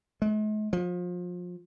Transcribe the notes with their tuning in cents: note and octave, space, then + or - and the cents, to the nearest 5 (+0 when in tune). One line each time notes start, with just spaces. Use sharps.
G#3 +45
F3 +30